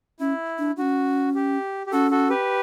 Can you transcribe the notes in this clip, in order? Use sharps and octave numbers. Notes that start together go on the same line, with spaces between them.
C#4 E4
D4
C#4 D4 F#4
G4
G4
C#4 F#4 A4
F#4 A4
G4 B4